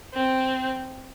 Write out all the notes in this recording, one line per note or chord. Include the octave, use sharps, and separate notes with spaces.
C4